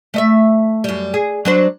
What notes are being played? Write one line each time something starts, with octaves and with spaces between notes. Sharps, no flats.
A3 D#5 E5
F#2 G3
G#4
F#3 D4 C5